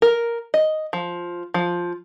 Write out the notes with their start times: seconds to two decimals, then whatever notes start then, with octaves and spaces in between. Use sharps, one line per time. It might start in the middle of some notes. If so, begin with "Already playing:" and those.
0.02 A#4
0.54 D#5
0.93 F3
1.54 F3